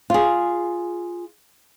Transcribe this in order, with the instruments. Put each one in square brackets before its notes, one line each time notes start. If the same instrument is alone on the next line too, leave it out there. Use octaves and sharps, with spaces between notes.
[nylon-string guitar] F4 G#4